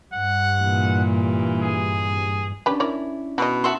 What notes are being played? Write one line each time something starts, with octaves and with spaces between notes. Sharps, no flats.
G2 F#5
A#2 E3
G#4
C#4 D4 G4 B4
E4 A#4 C#5 D5
B2 F#4 D#5
F#4 E5 A5 C6